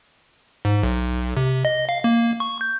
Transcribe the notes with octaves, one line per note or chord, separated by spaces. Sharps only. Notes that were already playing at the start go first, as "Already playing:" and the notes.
G#2
B1
C3
D#5
F5
A#3
C#6
G6